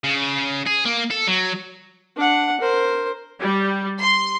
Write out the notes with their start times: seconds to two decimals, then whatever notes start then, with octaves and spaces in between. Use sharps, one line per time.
0.04 C#3
0.67 G#4
0.85 A#3
1.11 A4
1.27 F#3
2.16 D4 F#5
2.60 A#4 C5
3.40 G3
3.99 C6